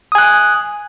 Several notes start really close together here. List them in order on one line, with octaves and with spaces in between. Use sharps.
D#6 G#5 F#6